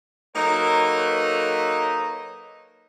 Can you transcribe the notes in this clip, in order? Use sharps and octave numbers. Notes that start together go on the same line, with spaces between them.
F#3 A#3 D#4 A4 B4 C#5